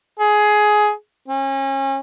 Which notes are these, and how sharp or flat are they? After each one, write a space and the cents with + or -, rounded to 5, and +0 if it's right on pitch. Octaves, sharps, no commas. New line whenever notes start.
G#4 +15
C#4 -35